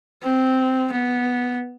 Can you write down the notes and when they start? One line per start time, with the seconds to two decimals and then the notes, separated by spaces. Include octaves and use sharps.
0.23 C4
0.92 B3